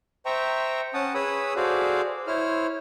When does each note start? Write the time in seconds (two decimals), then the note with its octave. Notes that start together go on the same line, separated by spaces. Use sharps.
0.26 C5 E5 G5 A#5 C#6
0.94 C#4 F#5 A5 D#6
1.14 G#4 B4 C#5 B5 D#6 E6
1.56 F#4 G#4 A4 C5 D5 F5
2.27 E4 C5 C#5 F6